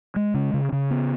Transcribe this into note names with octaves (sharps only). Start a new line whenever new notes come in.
G#3
C#3
C#3
C#3
B3